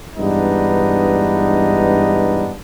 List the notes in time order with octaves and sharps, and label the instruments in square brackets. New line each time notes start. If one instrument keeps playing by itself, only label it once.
[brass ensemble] G2 E3 G#3 B3 D4 D#4